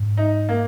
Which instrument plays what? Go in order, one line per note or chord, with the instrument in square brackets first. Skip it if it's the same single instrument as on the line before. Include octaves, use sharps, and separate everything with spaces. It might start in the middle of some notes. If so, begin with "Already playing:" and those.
Already playing: [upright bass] G#2
[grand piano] D#4
A#3